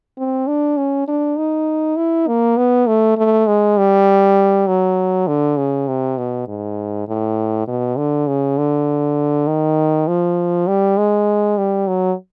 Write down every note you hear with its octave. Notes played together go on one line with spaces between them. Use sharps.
C4
D4
C#4
D4
D#4
E4
A#3
B3
A3
A3
G#3
G3
F#3
D3
C#3
C3
B2
G#2
A2
B2
D3
C#3
D3
D#3
F3
G3
G#3
G3
F#3